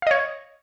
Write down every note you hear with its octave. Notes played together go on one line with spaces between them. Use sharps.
C#5 D#5 F5